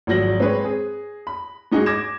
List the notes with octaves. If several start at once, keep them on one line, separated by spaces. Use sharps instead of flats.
G#1 F3 F#3 A#6 F#7
G#3 C4 G#4 B4 C#5
G#4
B5
G#2 D#4 F#4 G#4
D6 G#6 A#6 E7